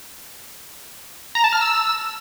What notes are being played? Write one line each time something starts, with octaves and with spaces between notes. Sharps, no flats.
A#5
A5
F6
E6